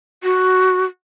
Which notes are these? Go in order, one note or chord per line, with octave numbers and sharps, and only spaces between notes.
F#4